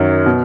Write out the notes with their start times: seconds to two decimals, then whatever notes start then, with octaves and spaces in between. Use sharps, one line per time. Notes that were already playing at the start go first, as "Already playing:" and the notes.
Already playing: F#2 D#3 F#3
0.26 B2